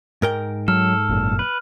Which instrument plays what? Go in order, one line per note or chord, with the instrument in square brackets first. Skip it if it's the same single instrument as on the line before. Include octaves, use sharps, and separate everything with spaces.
[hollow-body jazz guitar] G#2 A#4 G5
[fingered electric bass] F#3 [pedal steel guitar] A4 [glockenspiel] F6
[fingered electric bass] G1 F#2 A#2
[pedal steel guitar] B4